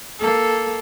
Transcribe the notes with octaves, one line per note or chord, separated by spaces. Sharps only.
A#3 A4